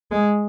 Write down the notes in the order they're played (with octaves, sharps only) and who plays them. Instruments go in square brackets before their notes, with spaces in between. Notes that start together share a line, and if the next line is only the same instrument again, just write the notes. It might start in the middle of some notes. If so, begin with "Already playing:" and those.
[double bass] G#3